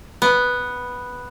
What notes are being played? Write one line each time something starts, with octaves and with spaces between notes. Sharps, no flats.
B3